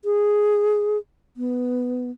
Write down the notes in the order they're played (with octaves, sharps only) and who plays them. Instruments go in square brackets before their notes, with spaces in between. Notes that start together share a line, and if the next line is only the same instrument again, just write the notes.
[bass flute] G#4
B3